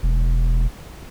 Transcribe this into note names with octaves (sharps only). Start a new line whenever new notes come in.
E1